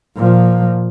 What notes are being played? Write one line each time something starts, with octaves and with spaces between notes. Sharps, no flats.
A#2 F3